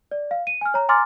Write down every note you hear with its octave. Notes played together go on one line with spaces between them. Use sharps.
D5
F5
D#7
G#5 F6
C#5 A#5
G#5 A#5 C6 D6 F6 A6